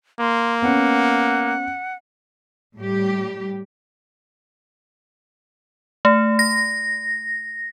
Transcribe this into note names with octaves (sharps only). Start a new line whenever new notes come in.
A#3 C6
B3 C#4 F#5
A2 G3 G4
A3
A#6